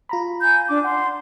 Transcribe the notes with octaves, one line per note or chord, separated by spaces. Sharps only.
F4 A#5 B5
G#5 G6
D4 D6
F#5 C6